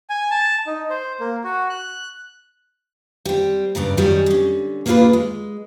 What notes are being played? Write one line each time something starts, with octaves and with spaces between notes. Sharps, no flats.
G#5
A5
D#4
C5
A#3
F#4
F#6
G3 C4
G2 C#3 D5 A#5
F#2 D#3 G3 C#5 D#5 G#5
D3 C#4
A#3 B3 D4 F4 G#4 B4
G#3